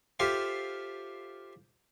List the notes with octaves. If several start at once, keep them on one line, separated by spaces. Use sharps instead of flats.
F4 G4 A4 C5 E5 F5